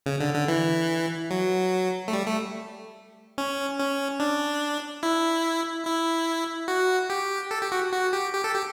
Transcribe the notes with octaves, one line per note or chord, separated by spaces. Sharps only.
C#3
D3
D3
E3
F#3
A3
G3
A3
C#4
C#4
D4
E4
E4
F#4
G4
A4
G4
F#4
F#4
G4
G4
A4
G4